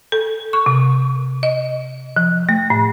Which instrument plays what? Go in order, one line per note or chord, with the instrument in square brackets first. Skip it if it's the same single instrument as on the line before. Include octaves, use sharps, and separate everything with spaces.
[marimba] A4
C#6
C3
D#5
F3
A3
A2